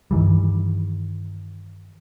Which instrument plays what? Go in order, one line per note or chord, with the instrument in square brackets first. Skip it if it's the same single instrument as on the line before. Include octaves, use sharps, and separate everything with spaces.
[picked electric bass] G2 D#3 E3 G3